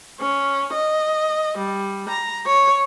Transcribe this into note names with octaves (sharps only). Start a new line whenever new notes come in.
C#4
D#5
G3
A#5
C#5